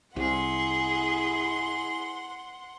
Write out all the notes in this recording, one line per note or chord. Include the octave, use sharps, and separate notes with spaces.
C2 C3 E4 G#4 F#5 C6